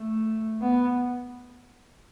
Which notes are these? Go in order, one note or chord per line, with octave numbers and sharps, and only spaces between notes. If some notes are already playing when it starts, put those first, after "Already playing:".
Already playing: A3
B3